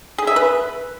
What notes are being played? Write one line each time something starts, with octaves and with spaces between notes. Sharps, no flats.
G#4
E5
B4